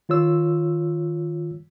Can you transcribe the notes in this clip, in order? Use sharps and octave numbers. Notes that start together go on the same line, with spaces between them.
D#3 F4 C#5 E6